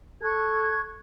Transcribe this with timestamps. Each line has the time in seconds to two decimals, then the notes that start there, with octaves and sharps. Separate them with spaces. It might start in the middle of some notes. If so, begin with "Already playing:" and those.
0.22 A4 C#6 F#6 G#6